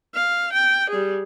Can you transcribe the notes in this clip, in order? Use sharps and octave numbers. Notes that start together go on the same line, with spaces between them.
F5
G5
G3 G#4